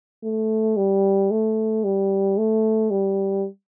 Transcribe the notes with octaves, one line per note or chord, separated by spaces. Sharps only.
A3
G3
A3
G3
A3
G3